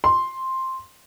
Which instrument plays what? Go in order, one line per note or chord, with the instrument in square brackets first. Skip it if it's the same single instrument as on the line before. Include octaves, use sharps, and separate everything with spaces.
[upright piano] C6